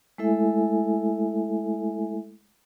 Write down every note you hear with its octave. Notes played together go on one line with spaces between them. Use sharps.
G#3 A3 E4 A4 E5 G#5